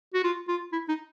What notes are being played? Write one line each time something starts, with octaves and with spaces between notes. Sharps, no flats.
F#4
F4
F4
E4
D#4